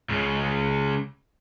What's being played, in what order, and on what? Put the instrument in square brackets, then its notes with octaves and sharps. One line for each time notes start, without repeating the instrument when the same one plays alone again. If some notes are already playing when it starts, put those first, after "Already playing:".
[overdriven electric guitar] C#2 C#3